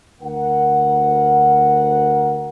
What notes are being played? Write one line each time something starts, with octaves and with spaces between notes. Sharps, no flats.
D2 A#4 F#5